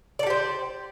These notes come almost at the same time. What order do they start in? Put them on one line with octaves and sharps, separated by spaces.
D5 A4 G4 C5